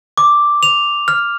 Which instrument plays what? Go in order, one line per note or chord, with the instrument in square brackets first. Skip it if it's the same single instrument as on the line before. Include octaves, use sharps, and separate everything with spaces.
[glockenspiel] D6
F7
F6